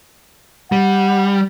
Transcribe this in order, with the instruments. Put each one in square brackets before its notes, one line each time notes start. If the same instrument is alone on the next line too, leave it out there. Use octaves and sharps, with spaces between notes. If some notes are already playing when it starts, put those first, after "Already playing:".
[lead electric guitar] G3 [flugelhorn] F#5